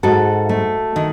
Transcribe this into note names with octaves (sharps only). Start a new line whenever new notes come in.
G#2 F#4 A4
A3
D#3